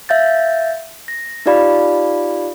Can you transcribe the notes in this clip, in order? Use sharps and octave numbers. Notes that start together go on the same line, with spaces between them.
E5 F5 G6 A6
A#6
D#4 F4 G4 D5 F5 B5